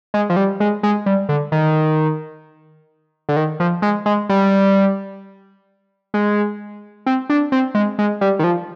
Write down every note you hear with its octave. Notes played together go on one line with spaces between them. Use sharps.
G#3
F3
G3
G#3
G#3
G3
D3
D#3
D3
D#3
F3
G#3
G#3
G3
G#3
C4
D4
C4
G#3
G#3
G3
D#3
F3